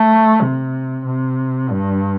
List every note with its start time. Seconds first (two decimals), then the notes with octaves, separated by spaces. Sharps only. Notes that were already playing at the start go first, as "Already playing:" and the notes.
Already playing: A3
0.41 C3
1.06 C3
1.70 G2